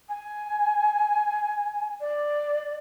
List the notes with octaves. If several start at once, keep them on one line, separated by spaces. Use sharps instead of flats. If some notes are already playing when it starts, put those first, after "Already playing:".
G#5
D5